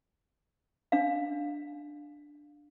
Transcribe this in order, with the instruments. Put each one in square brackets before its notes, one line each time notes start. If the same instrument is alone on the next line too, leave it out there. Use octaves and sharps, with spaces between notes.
[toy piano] D4 F5